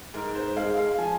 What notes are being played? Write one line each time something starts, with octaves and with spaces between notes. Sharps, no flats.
G#2 A#4
C5
G#3 F5
F5
F3 G#5